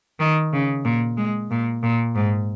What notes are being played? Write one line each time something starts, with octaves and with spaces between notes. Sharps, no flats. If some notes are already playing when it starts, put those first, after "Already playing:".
D#3
C#3
A#2
G#3
A#2
A#2
G#2